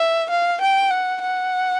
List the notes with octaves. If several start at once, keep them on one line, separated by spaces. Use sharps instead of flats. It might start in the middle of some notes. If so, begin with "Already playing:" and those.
Already playing: E5
F5
G5
F#5
F#5